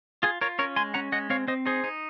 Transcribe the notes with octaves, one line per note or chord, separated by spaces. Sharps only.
F4 G#4
F4 A#4 C#5
C#4 A#4 C#5
G#3 G#5 C6
C#4 F#5 A#5
G#3 D#5 F#5
C4 C#5 F5
C4 C5 D#5
D#4 G#4 C5
D#4